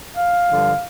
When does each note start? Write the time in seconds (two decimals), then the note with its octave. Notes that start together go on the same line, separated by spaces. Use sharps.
0.16 F5
0.49 G2 D3 F3